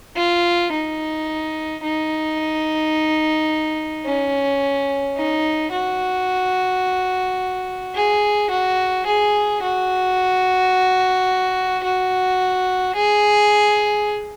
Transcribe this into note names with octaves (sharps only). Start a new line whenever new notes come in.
F4
D#4
D#4
C#4
D#4
F#4
G#4
F#4
G#4
F#4
F#4
G#4